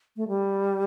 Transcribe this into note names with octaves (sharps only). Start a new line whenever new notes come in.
A3
G3